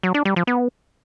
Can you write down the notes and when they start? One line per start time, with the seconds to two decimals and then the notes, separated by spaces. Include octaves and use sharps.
0.03 F#3
0.14 D4
0.25 G3
0.36 F3
0.47 B3